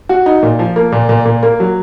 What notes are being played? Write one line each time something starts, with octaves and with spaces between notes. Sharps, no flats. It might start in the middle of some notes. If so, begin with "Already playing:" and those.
F#4
D#4
A#2
F3
A#3
A#2
A#2
A#2
A#3
F#3